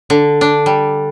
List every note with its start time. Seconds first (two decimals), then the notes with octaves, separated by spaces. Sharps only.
0.10 D3
0.41 D4
0.66 G3